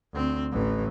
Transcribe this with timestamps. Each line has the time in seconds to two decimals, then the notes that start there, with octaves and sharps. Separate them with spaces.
0.13 D2 C4
0.52 A1 E3